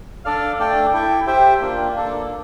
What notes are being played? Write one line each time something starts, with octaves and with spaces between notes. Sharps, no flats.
D4 A4 D5 F5
A3 D4 A4 D5 G5
E4 A4 E5 G5
G4 C5 E5 G5
A#3 D4 F4
A#3 D4 A4